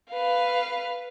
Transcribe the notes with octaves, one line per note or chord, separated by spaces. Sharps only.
B4 F5